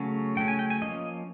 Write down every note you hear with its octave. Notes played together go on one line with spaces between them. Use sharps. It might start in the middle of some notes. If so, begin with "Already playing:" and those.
Already playing: C#3 F#3 A3 C#4
C#3 F#3 A3 C#4 G5
G#5
G5
G#5
F3 A#3 C#4 D#5